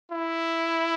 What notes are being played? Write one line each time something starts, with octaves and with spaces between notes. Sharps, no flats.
E4